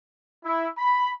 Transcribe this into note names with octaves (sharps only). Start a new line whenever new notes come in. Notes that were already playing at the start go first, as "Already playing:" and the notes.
E4
B5